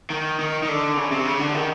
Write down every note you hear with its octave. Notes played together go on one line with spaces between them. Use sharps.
D#3
D#3
D#3
D3
C#3
C3
C#3
D3
D#3